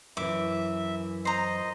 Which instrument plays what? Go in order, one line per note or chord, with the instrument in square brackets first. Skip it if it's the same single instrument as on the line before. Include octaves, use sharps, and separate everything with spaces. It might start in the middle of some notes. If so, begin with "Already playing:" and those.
[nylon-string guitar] F#2 E3 [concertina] E5 [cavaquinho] D6
[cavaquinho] C5 A#5 [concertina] D#5